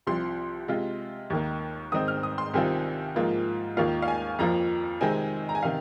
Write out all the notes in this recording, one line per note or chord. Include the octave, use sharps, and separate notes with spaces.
C2 C3 F3 C6
C3 G#3 F4
D#2 D#3 A#3
G#2 D#3 C4 D#4 D#6
F6
D#6
C6
C2 C3 D#3 C4 F4 G#5
G#2 F3 A#3 F4
D#2 D#3 A#3 F4 F5
F5
G#5
F2 F3 A#3 F4 A#5
C3 D#3 G#3 C4 D#4 G#5
A#5
G#5
C3 D#3 F5